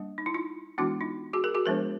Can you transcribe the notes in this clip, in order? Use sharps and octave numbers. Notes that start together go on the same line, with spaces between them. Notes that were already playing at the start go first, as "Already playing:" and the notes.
Already playing: G3 A#3 D4
D#4
E4
D#4 F4
E3 G#3 B3 D4 E4 F#4
D#4 F4
F#4 G#4
G#4 A#4
F#4 G#4
F3 G#3 B3 D4 A#4 C5